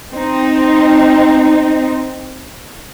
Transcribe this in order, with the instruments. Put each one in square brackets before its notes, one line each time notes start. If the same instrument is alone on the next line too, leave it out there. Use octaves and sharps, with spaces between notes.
[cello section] C4 D#4